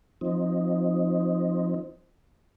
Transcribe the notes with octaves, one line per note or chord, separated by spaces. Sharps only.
F3 C4 D#4